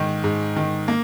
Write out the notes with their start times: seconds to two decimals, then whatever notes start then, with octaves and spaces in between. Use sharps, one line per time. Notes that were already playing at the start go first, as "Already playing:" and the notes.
Already playing: G#2 D#3
0.24 G#2
0.56 D#3
0.88 A#3